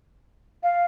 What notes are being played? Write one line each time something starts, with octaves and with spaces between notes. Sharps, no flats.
F5